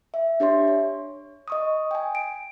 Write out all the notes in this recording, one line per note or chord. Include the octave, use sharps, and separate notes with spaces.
E5
D4 G4 C#5 E5 C6
C#5
D#5 C#6 D#6
G5 G#5
D7